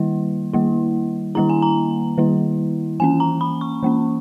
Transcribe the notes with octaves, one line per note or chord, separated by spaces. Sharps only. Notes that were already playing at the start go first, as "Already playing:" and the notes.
Already playing: D#3 G3 A#3 E4
D#3 G3 A#3 E4
D#3 G3 A#3 E4 A#5
G#5
A#5
D#3 G3 A#3 E4
E3 A#3 C#4 G#5
A#5
B5
C#6
E3 A#3 C#4